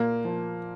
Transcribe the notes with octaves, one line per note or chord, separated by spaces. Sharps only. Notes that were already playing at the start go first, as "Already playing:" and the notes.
Already playing: A#2 A#3
F3